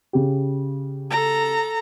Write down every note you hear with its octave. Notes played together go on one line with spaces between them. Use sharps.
C#3 G4
A4 A#5